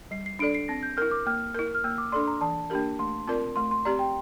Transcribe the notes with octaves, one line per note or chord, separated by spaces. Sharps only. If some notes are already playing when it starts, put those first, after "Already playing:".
G3 C7
C7
D4 A4 D5 D7
C7
C4 A#6
G6
E4 A#4 F6
D6
A#3 F6
E4 A#4
F6
A#3 E6
D6
D4 A4 D5 C6
A#5
E3 A5
A#3 D4 G4 A#4
A3 C6
C4 F4 A#4 D5
A3 C6
C6
C4 G4 D5 A#5
G5